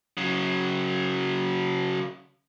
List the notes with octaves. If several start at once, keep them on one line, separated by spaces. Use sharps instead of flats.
C#3 F#3